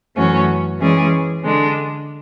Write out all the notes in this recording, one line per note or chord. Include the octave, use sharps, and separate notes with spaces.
F#2 E3 A3 C#4 F#4
E3 G#3 C#4 G#4 D5
D3 G#3 D4